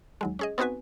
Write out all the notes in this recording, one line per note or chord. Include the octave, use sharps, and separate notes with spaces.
D#2 F#3 G#3
C#4 G#4 D#5
B3 C4 D#4 F#4 B4 G#5